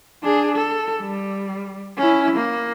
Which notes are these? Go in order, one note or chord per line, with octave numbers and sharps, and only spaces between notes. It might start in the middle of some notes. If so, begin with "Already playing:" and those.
D4 G#4
A4
G3
C#4 E4
A#3